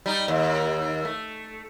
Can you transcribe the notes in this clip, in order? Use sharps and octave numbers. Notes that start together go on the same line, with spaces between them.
G3 D#4
D#2
A3